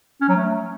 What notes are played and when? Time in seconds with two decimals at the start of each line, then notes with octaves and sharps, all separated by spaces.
0.21 C#4
0.29 F#3
0.36 A3